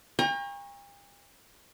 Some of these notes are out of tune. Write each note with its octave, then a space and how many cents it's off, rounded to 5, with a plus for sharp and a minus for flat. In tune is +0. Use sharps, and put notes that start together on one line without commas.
G5 +45 A#5 +30 C#6 -15